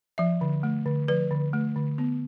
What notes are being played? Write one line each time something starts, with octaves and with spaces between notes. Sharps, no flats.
F3 E5
D3
A3
D3
F3 B4
D3
A3
D3
B3